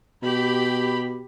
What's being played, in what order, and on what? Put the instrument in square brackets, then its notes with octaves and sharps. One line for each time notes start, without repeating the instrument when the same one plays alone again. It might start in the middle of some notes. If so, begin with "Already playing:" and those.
[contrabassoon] B2 [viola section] G4 B5